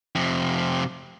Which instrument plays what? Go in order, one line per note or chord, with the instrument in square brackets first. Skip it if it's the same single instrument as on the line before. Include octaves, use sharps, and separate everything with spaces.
[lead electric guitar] F2 C3